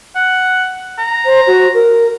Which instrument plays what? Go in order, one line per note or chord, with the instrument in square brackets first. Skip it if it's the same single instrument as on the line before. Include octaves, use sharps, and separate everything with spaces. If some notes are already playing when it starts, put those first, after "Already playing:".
[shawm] F#5
A#5
[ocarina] C5
F#4
A#4